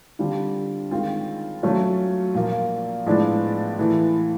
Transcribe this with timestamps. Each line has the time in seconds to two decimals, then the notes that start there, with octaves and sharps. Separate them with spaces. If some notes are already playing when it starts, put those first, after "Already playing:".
0.19 D3 G3 C4 F4
0.91 D#3 G#3 C4 F4
1.63 F#3 A3 C#4 F4
2.34 A#2 F3 A#3
3.07 A2 F3 G#3 B3 D4
3.78 A2 E3 A3